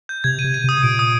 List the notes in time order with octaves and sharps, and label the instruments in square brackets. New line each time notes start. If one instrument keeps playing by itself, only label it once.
[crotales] G6
[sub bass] C3 [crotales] G#6
[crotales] D#7
[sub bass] C3
[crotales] D#7
[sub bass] C3 [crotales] D#6
[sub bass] A#2 [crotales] D7
[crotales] D#6